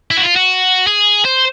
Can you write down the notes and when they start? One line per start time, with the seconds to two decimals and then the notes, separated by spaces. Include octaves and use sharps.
0.11 E4
0.17 F#4
0.23 F4
0.36 F#4
0.87 G#4
1.25 C5